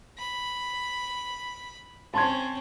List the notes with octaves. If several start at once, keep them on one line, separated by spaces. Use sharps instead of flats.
B5
C4 C#4 A5 C6 G#6